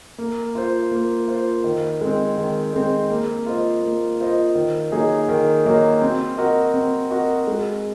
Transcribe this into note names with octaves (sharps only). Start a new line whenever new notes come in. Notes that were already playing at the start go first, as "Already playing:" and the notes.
A#3
F4 C5
A#3
F4 C5
D#3
G#3 C4
D#3
G#3 C4
A#3
F4 C5 D#5
A#3
F4 C5 D#5
D#3
F#3 A#3 D#4 G#4
D#3
F#3 A#3 D#4 G#4
C4
F#4 A#4 D#5
C4
F#4 A#4 D#5
G#3